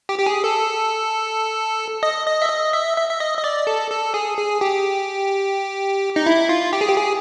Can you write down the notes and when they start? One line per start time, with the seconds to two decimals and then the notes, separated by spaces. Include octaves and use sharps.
0.09 G4
0.19 G4
0.26 G#4
0.44 A4
2.03 D#5
2.27 D#5
2.42 E5
2.49 D#5
2.73 E5
2.97 E5
3.09 E5
3.20 D#5
3.38 D#5
3.44 D5
3.67 A4
3.91 A4
4.14 G#4
4.38 G#4
4.61 G4
6.16 D#4
6.26 E4
6.49 F4
6.73 G4
6.81 G#4
6.88 G4
6.97 G#4